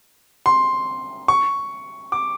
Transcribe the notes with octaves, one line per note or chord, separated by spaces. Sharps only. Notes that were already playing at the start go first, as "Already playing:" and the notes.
C6
C#6
D6